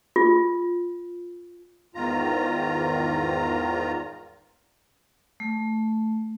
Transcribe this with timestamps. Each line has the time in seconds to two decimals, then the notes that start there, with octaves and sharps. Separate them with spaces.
0.16 F4
1.95 E2 G#2 D#3 F4 A#5
5.40 A3